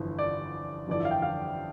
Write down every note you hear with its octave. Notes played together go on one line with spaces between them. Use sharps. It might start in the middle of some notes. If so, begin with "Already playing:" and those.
Already playing: G1 F2 E3
D5
G1 F2 E3 D5
E5
F5
G5
F5